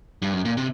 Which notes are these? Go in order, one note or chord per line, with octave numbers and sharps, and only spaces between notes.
G2
F#2
A#2
C3